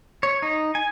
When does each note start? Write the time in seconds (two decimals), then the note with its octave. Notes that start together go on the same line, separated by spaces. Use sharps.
0.23 C#5
0.42 D#4
0.75 G#5